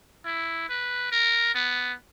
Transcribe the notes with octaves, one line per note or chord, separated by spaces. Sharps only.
E4
B4
A#4
B3